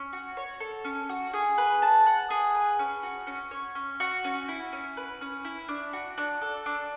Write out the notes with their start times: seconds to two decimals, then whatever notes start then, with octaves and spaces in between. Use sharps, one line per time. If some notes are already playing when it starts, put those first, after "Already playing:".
Already playing: C#4
0.13 F#4
0.37 C#5
0.60 A4
0.85 C#4
1.09 F#4
1.34 G#4
1.58 B4
1.82 A5
2.06 F#5
2.30 G#4
2.55 B4
2.79 C#4
3.03 F#4
3.27 C#4
3.51 C#5
3.75 C#4
4.00 F#4
4.24 C#4
4.48 E4
4.73 C#4
4.97 B4
5.21 C#4
5.45 E4
5.68 D4
5.93 F#4
6.18 D4
6.41 A4
6.66 D4